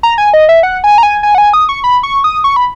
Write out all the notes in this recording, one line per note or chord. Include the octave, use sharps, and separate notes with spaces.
A#5
G#5
D#5
E5
F#5
G#5
A#5
G#5
G#5
F#5
G#5
D#6
C#6
B5
C#6
D#6
C#6
B5